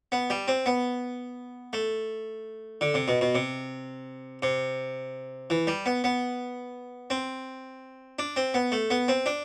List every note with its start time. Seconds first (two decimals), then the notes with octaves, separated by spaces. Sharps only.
0.12 B3
0.30 G3
0.48 C4
0.66 B3
1.73 A3
2.81 D3
2.94 C3
3.08 B2
3.21 B2
3.35 C3
4.42 C3
5.50 E3
5.67 G3
5.86 B3
6.04 B3
7.10 C4
8.19 D4
8.36 C4
8.54 B3
8.72 A3
8.90 B3
9.08 C4
9.26 D4